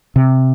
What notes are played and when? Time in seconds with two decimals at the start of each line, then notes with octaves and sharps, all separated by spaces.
0.16 C3